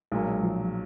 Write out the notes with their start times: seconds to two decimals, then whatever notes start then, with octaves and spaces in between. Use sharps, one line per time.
0.12 B1 A#2 F#3 G#3 A#3
0.28 G#3
0.43 F3